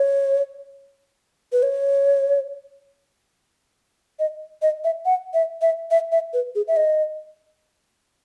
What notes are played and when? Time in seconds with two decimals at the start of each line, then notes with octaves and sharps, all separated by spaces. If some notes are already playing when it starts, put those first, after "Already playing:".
Already playing: C#5
1.52 B4
1.63 C#5
4.19 D#5
4.62 D#5
4.84 E5
5.06 F#5
5.34 E5
5.62 E5
5.91 E5
6.12 E5
6.34 B4
6.55 G#4
6.68 E5
6.77 D#5